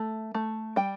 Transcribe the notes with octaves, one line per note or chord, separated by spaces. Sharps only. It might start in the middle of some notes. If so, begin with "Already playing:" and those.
Already playing: A3
A3
G3 G5